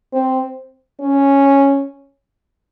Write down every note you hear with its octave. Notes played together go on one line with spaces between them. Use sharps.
C4
C#4